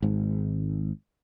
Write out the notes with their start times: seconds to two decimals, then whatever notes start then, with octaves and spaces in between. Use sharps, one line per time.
0.02 G#1 G#2